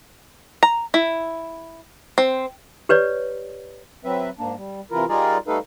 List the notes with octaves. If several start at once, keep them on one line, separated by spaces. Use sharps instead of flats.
A#5
E4
C4
G4 B4 C#5 D5
F#3 C4 B4 E5
G#2 A#3 D4
G3
C3 E3 E4 F4 A#4
G3 D#4 F4 G#4 A#4 D5
G3 A3 D#4 A4 B4 F5